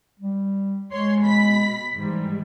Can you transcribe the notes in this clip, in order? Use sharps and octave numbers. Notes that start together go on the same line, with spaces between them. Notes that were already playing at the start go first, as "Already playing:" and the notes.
G3
G#3 C#5 C6
B2 B5 B6
G#2 D#3 E3 G3